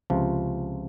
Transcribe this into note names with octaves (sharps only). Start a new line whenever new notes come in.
C#2 C3 F3